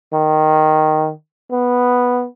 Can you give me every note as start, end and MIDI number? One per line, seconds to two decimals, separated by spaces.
0.13 1.11 51
1.52 2.26 59